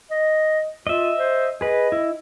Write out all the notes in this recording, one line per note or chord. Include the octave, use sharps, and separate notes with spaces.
D#5
F4 D#5 E5
C5
G#4 B4 D#5
E4